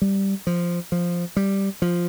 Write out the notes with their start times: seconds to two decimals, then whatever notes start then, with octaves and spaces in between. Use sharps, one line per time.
0.02 G3
0.47 F3
0.92 F3
1.36 G3
1.82 F3